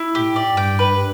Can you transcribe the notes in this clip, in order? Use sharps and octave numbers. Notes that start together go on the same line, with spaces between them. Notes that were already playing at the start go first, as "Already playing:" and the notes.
Already playing: E4
A2 G4
D5
G2 G5
B4